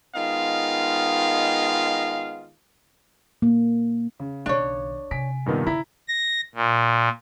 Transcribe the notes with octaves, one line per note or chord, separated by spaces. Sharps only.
D#3 G#3 B3 F4 D#5 F5
A#3
C#3
B1 D#3 D4 C#5
C3 G#5 B6 D7
G2 A#2 D#3 B3 D#4 A#4
C#3 E4 A#5 B6
A#6
A#2